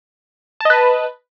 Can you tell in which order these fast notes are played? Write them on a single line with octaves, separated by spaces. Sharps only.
A5 D#5 B4